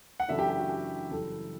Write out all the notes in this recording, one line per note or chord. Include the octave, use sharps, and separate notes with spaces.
F#5
F#2 C#3 E3 A3 D4 E5
G4
G4
F#4
G4
F#1 F#2 E3 G3 A4